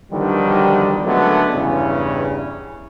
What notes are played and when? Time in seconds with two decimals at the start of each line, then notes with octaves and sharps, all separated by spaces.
0.11 B1 D3 D#3 F3 G3
1.04 F#2 D3 F#3 G#3 A3 B3
1.53 E2 G2 C#3 C#4 E4